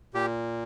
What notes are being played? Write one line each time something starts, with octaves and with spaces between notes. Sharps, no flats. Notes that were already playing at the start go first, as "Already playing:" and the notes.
A#2 G4